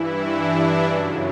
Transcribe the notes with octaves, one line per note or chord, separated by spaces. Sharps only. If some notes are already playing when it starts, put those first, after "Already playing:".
Already playing: G2 E3 E4
D4
F#2 C#3 F#3